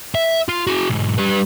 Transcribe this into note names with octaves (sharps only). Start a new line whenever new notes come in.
E5
F4
F#4 G#4
B1 G#2
G3 B4